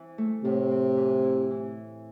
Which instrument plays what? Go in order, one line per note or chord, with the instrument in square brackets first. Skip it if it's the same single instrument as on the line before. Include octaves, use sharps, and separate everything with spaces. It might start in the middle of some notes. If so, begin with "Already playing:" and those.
Already playing: [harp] E3 C4
A3
[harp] A2 [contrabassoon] C3
[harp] C4
E3
E4
E3